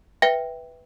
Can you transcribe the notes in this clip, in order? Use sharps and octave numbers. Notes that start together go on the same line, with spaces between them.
B4 E5 G5 A#6